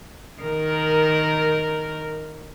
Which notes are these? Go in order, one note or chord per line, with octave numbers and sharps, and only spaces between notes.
D#3 A#4